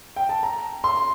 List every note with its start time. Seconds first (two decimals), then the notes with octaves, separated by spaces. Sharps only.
0.16 G5
0.29 A5
0.43 A#5
0.84 C6